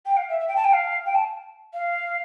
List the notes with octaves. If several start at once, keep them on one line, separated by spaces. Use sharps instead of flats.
G5
F5
E5
E5
G5
A5
G5
F5
G5
A5
F5